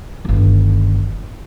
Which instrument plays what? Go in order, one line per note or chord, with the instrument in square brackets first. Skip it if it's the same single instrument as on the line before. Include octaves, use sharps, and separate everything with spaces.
[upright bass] G1 D#3